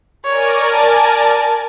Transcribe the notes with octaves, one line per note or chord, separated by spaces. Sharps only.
A#4 C#5 D5 G#5
A5